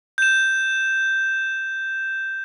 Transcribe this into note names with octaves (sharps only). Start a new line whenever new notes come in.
G6 E7